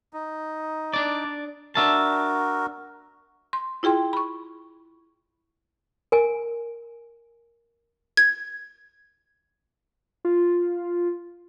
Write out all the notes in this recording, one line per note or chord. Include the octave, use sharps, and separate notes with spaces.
D#4
D4 D5
D4 F#4 A#4 E5 A5
C6
E4 F4 G#4 G5 C6
B5 C#6
A#4 G#5
G#6
F4